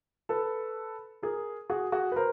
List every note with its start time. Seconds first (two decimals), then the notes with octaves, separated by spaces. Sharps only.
0.29 A4 B4
1.22 G#4 A#4
1.70 F#4 G#4
1.92 F#4 G#4
2.12 B4
2.16 A#4 C5